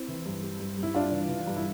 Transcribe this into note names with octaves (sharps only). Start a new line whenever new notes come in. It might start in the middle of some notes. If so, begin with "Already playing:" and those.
Already playing: C4 E4
E3
G2
G3
G2
G2 E4
G3 D4 F4
E3
E3
G2
E4